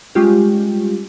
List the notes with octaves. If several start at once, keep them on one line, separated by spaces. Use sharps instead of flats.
G3 G#3 C#4 F4 G4